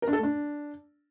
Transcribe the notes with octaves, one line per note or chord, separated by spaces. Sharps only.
A#4
D4
A4
A3
D4